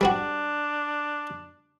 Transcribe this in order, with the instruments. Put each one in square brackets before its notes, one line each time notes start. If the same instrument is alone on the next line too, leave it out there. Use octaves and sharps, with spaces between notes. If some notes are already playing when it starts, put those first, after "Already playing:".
[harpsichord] G3 C4 F#4 [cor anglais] D4